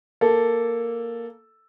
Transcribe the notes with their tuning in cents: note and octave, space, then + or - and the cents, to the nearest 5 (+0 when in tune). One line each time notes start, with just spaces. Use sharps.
A#3 +0 A4 +0